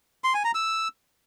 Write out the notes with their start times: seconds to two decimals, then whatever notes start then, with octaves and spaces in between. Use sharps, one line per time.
0.24 C6
0.34 G#5
0.44 A#5
0.55 E6